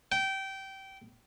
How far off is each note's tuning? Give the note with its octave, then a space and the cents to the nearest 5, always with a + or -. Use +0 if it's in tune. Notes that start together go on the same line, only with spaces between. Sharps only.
G5 -20